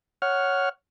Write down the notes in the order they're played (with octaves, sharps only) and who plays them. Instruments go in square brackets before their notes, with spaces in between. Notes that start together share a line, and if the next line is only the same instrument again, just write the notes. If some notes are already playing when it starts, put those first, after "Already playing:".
[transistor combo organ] C#5 F#5 F6